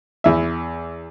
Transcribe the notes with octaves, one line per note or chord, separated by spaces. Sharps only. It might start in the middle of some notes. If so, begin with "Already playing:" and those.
E2 E5